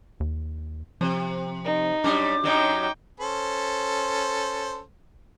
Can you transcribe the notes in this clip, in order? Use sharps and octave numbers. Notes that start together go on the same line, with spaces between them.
D#2
C3 F3
D#4
F#2 G3 D4 D6
F#2 F#3 D#4 G5
C#4 A4 C5